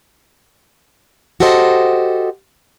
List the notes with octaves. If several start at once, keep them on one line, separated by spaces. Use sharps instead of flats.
F#4 G4 A4 C5 D#5